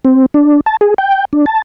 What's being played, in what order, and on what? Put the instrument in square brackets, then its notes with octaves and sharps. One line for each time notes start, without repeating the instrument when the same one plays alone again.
[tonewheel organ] C4
D4
A5
G#4
G5
D4
A5